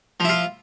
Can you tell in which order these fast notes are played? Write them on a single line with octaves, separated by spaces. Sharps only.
F3 E4 F4